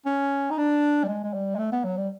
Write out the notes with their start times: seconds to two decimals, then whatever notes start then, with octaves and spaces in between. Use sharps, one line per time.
0.06 C#4
0.51 D#4
0.58 D4
1.04 G3
1.08 G#3
1.24 G#3
1.34 G3
1.55 G#3
1.59 A3
1.72 B3
1.84 F#3
1.97 G3